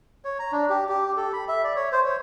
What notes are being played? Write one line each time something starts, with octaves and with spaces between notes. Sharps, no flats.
C#5
A#5
D4
G4
G4
A4
B5
E5
D5
C#5
C5
C#5